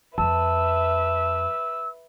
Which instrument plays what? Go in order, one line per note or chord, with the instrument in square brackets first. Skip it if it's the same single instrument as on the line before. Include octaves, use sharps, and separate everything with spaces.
[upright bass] F2 [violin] B4 E5 [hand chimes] A5 [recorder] E6